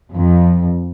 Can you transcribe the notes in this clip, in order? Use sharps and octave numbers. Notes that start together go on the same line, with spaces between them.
F2